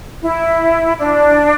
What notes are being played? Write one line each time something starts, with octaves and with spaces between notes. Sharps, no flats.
E4
D4